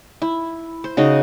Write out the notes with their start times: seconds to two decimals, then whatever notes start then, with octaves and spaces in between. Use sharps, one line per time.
0.22 E4
0.84 C5
0.97 C#3 D#4 F#4 D#5